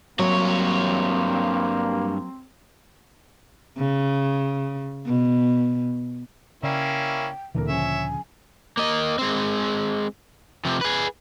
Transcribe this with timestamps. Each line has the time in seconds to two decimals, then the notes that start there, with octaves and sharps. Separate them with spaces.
0.19 G2 F#3 A#3 C4 C#5
3.78 C#3
5.06 B2
6.63 C#3 A#3 C#4 E4 D5 G5 C7
7.55 D2 A#2 D3 E3 A4 A#4
7.68 C#3 F3 C#5 E5 G#5
8.77 A#3 D#5
9.18 G#3 C4
10.65 C3 F3
10.81 G#4 B4